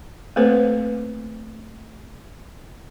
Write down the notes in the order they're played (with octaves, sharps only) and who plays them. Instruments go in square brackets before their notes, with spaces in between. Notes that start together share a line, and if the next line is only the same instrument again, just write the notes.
[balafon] A3 A#3 C4 A4 B4 C5